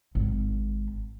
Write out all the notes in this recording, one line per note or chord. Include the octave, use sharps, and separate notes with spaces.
G#1